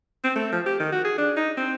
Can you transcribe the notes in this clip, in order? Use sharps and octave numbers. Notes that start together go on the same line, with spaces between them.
C4
A3
F3
G4
D#3
F#4
G#4
D4
D#4
C4